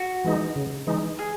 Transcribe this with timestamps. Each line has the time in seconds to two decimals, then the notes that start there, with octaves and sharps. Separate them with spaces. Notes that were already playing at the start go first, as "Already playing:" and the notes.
Already playing: F#4
0.24 E3 G#3 D#4
0.56 C#3
0.87 E3 G#3 D#4
1.19 G#4